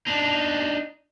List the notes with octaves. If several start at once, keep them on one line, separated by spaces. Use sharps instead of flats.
D4 D#4